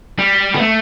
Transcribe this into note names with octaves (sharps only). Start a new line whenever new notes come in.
G3
B3
A3